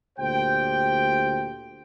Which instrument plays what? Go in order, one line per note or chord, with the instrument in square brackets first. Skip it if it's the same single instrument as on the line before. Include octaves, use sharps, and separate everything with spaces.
[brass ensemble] D2 A#2 G4 C5 G5